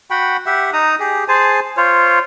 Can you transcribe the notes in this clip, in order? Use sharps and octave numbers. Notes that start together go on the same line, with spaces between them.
F#4 F#5 G5 B5
G4 E5 F#5
D#4 A#5 D#6
G4 G#4
G#4 C5 G#5 A5
F4 C5 C#5